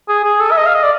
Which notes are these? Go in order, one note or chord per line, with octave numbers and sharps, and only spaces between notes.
G#4
G#4
A4
E5
D#5
F5
D#5
D5